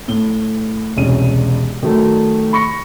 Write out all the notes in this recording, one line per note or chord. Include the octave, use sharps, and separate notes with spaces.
A2 G7
E1 C2 C#4 D#7
D#3 F#3 A3
B5 C#6 A#6 C#7